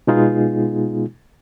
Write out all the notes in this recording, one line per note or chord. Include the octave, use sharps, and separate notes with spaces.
B2 G#3 B3 D#4 F4 G#4